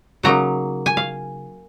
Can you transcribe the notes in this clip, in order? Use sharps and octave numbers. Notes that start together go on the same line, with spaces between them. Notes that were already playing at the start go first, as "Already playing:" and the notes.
C#3 F#3 A#3 D#4 A#5
G#5
F5